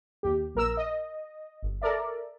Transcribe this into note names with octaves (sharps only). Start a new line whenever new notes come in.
D#2 G4
A#1 A#4 E6
D#5
G1
A4 A#4 D5 E5